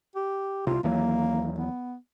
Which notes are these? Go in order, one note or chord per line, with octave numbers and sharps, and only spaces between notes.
G4
C2 C3 F4
D#2 E3 F#3 A#3
B3